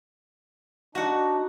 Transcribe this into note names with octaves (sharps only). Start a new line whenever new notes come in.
D4 D#4 F#4 F#5